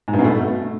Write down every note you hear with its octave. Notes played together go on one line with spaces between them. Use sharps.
G#2
G2
B2
A3